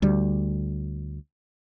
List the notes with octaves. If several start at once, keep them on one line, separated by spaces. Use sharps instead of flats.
D2 G3